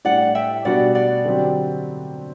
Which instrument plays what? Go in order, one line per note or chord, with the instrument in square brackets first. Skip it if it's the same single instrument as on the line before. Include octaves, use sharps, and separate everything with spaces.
[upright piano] A2 G3 D4 G4 [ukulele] D5 F#5
[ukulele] E5 G5
[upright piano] B2 G3 D4 F#4 [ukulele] D5 F#5
[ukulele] D5 F#5
[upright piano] D3 F#3 C4 G4